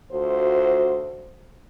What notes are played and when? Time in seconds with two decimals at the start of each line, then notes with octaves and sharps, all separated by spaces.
0.12 D2 F4 F#4 C5